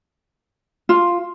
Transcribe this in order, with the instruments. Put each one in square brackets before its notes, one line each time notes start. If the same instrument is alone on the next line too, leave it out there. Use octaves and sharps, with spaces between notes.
[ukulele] F4